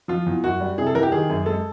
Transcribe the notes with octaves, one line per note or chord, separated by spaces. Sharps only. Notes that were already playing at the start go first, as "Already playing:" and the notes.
F3 F4
E2
F#2 F#4
G3
C3 G#4
A4
E3 A#4
G4
D#3 G#4
F#2
G#3 A4